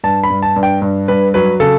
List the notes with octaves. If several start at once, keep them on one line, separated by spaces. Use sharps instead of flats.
G2 A5
B5
G2
A5
G2
G5
G2
G2 B4
F#3 B4
C#3 A4